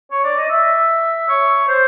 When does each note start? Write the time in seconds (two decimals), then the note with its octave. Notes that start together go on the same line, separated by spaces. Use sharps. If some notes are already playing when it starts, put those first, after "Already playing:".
0.11 C#5
0.24 D5
0.37 D#5
0.49 E5
1.28 C#5
1.68 C5